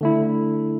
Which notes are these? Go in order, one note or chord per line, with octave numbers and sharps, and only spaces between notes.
D3 A3 E4